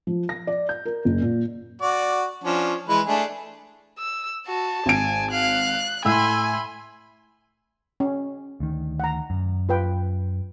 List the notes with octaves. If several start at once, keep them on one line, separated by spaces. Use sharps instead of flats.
F3
A#6
D5
G6
A#4
F#1
A#2
F#4 D5
F3 C#4 D4
E3 G#3 B4
A3 D4 G#4
E6
F#4 A5
G#1 G#5 D7
F5 F#6
A2 G#5 B5 C6 E6
C#4
D2 D#3
F#5 A#5
F#2
F4 B4 G5